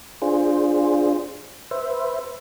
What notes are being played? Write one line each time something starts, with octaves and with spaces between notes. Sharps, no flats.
D4 F4 G#4 C5
B4 C5 E5